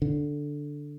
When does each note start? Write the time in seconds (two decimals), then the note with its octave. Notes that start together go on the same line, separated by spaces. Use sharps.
0.02 D3